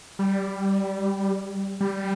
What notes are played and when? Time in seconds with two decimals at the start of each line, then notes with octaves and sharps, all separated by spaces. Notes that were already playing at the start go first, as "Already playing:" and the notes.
0.19 G3
1.80 G3